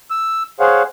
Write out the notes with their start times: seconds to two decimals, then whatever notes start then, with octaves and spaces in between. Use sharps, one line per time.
0.11 E6
0.60 G#4 C5 C#5 F5 F#5